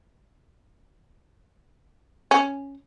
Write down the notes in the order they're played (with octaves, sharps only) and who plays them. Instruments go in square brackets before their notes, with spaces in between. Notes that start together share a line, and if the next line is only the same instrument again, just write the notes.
[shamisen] C#4